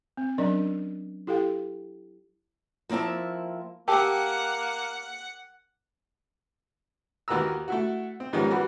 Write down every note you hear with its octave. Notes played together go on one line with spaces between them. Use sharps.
C4
F#3 C#4 D4 A#4 D5 D#5
E4 G4 A4 F5 G5
F3 A#3 C4 E4 A5
A#3 G4 A#4 F#5 G5 A5
D#2 D#3 E3 F#4 A#5 E6
A3 E4 F#4
C4
G#2 D#3 F3 G3 B3 C#4
E3 G3 F#4